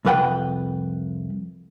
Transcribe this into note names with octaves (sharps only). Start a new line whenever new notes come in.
C2 F2 B4 F#5 G5